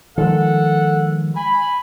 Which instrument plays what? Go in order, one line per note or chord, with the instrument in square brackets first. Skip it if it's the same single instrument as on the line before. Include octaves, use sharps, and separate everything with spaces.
[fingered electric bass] D#3 F3 G#3 [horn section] A4 F#5
[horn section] G#5 B5